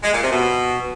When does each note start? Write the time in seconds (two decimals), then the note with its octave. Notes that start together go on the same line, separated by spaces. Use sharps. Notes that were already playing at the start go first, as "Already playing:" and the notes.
0.03 G#3
0.12 A#2
0.22 C3
0.31 B2